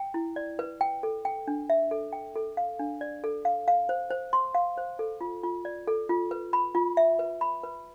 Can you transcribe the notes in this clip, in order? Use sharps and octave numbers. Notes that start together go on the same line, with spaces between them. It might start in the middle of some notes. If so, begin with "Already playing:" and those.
Already playing: G5
E4
D5
B4
G5
A4
G5
D4
E5
A4
G5
A4
F5
D4
D5
A4
F5
F5
C5
C5
C6
F5
C5
A4
F4
F4
D5
A4
F4
B4
B5
F4
E5
B4
B5
B4